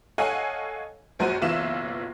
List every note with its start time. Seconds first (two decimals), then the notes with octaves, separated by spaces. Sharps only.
0.18 A4 C#5 D#5 F5 F#5 G#5
1.19 A#1 F#2 F#4 C5 D#7
1.41 F#1 B1 E3 F4 E5 E7